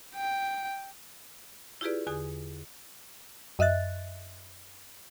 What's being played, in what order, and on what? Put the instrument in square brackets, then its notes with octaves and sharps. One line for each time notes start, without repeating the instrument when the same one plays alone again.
[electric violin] G5
[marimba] E4 F4 G4 G#4 B4 D5
E2 D3 G#4 G#5 D#6
[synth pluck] F#2 D#5 E5 F#6 A6